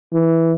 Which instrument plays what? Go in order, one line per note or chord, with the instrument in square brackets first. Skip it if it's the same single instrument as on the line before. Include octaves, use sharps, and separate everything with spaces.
[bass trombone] E3